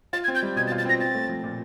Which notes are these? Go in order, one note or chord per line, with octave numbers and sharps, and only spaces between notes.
F4 A6
G#6
C4
G6
G3
B2 G#6
A6
F4
A6
C4 A#6
C4 A6
A3
F3
A#2